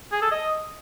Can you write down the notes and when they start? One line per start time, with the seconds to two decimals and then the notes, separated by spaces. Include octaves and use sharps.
0.12 G#4
0.22 A4
0.31 D#5